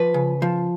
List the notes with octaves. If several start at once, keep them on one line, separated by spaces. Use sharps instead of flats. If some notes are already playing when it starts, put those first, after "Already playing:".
Already playing: F3 B4
C#3
F3